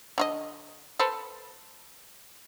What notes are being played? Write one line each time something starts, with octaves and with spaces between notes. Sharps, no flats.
D3 F4 D#5
A4 B4 C5